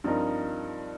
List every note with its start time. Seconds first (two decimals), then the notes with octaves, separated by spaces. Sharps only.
0.04 G2 F3 C4 D#4 A#4